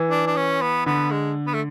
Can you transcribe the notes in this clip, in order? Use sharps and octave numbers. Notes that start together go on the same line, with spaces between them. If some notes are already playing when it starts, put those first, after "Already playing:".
Already playing: E3
D4
D4
C#4
B3
D3 B3
G#3
B3
A3